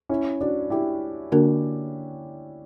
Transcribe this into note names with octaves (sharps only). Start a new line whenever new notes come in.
C#4 E4
D4 F#4
E4 G4
D3 A#3 D4 F#4 A#4